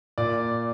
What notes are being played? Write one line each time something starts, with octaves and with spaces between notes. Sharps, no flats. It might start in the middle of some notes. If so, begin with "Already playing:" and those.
A#2 D5